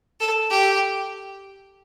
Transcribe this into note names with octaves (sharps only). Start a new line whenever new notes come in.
A4
G4